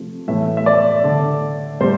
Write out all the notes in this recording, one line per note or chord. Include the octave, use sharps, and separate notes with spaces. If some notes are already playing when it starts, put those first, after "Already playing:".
Already playing: C3 F3 A3
A2 E3 A3 E5
E5
D5
D3 A3
A2 G3 C5